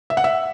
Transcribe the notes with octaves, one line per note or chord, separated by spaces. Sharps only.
E5
F#5
E5